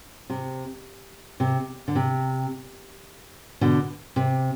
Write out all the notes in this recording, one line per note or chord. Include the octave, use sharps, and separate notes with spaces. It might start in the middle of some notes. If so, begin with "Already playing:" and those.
C3
C3
D3
C3
B2 D3
C3